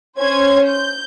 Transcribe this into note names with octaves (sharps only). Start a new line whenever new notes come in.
C#4 C5 G#6
G6